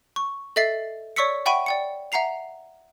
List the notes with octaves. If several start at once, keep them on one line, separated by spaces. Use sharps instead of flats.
C#6
A4 D#5 E5 A6 C7
C#5 D5 C#6 E6 B6 C#7
E5 F#5 G5 B5 C#6 D#7
D5 G5 C#7
E5 F#5 A#5 C7 F7